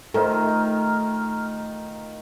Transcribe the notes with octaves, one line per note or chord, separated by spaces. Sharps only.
D#3 A3 D#4 F4 A4 C5 A#5 F6